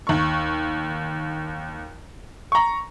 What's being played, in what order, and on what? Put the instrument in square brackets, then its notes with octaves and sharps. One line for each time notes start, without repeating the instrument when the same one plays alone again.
[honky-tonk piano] D#2 C#6
[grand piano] A#5 C#6